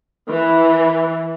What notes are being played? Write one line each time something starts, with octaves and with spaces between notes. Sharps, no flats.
E3